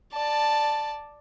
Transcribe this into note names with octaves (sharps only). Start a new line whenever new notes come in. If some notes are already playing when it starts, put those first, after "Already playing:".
D5 A5